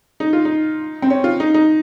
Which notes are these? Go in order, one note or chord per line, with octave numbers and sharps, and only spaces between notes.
D#4
F4
D#4
C4
C#4
F4
D#4
D#4